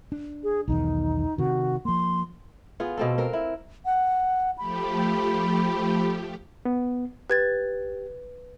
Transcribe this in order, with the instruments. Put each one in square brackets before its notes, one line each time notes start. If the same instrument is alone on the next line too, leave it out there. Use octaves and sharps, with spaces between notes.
[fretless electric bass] D4
[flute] G#4
[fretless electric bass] B1 E2 D#3 [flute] D#4
[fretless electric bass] C3 D#3 [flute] F#4
[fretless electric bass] F3 A#3 [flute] C6
[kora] B3 F4 G#4
B2 C4 A4
C4 A#4
E4
[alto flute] F#5
[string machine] F3 A3 G4 [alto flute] B5
[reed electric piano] B3
[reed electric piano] G4 [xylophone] B4 G#6 A6